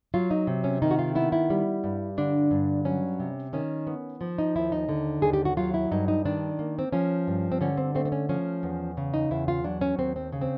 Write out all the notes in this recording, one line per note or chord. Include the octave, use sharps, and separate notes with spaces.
F#3 F4
D#4
C3
C#4
D#3 D#4
F#4
F4
B3 E4
E4
G3
G2
D3 D4
G2
F#3 C#4
C3
D#3 C#4
B3
F3
D#4
D#2 E4
D#4
D3
D#2 G#4
G4
F#4
F#3 F4
E4
G2 D#4
D#4
D#3 D4
A#3
C4
F3 C#4
G2
C4
D3 C#4
C4
A3 C4
C4
C#4
F3 C#4
E2
C#3
D#4
E2 E4
F4
F#3 D4
C#4
D#2 C4
C4
C#3
C4